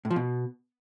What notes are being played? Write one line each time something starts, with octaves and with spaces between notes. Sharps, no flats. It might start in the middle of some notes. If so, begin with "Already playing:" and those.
A2
F3
B2